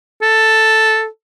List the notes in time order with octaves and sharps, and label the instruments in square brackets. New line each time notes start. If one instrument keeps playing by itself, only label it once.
[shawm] A4